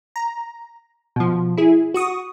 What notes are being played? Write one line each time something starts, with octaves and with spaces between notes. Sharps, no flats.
A#5
B2 F3
E4 G#4
F#4 C#6 D#6